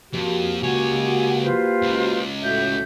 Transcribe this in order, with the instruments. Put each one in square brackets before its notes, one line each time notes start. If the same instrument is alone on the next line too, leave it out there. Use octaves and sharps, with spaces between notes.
[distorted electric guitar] F2 [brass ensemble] A#3 F#4 G4
[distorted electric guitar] C#2 C#5 [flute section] F#5 G#5
[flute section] F4 B4 C5
[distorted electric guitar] C#2
[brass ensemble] A2 [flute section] F#4 E5 G6